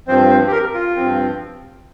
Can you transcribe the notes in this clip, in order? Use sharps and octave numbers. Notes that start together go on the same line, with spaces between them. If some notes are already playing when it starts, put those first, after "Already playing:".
G2 F3 C4 C5
C5
G4
A#4
F4
G2 F3 C4